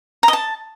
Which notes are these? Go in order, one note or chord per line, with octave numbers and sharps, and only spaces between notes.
A#5
D#5
A5